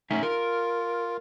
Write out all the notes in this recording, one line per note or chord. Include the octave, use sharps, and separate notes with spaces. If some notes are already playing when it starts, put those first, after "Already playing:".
A3 C#4 D#4 E5
F4 A#4